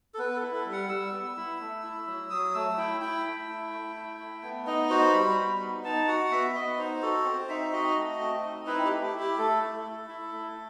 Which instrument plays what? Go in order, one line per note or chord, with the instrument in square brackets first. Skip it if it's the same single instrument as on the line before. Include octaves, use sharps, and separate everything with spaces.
[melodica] A4
B3 B4
A4
E4
A4
G3
F#5
G3 E6
B3
E4
A3
E4
F#3
F#3 D#6
A3 E6
E4 G5
E4 G5
A3
E4
A3
E4
A3
B3
D#4 D#5
F#4 C5
G3 B5
B3
D#4
D#4 A5
F#4 F#5
B3 E5
B3 D#5
D#4 C5
F#4 A4
C4 C5
D#4 E5
F#4 D#5
A3
C4
D#4
E4 B4
G4
A3
G4
E4 G4
A3 A4
E4
A3
E4
A3